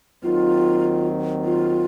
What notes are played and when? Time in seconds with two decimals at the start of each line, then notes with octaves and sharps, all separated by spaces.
0.23 D#2 D#3 F#3 C4 F4
1.45 F4